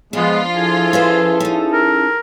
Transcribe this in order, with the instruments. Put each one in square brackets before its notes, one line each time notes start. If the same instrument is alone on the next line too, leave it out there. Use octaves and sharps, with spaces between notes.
[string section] F3 F4 [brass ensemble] G#3 [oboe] B3 [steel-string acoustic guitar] D4
[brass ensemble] E4 G#4 A4 [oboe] G#5
[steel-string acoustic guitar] C#4 B4 C5
C#4 D#4
[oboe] A#4